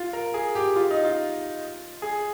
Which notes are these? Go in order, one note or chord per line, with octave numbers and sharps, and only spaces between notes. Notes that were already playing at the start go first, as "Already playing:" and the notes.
Already playing: F4
A#4
G#4
G4
F4
D#4
F4
G#4